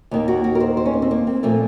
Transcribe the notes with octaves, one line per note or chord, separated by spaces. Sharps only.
D#2 D#3 A#3
F#4
F#4
A#4
C5
C5
C#4
A#3
C4
A#3
C4
A#2 F3 A3 A#3